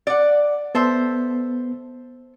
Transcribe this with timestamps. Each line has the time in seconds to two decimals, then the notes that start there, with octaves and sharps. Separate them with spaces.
0.07 D5 F#5
0.75 B3 A4 C5 E5